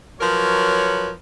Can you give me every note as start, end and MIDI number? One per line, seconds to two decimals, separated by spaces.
0.20 1.11 53
0.20 1.11 54
0.20 1.11 70
0.20 1.11 71
0.20 1.11 73